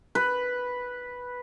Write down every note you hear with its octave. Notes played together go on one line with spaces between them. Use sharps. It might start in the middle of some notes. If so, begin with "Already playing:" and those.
B4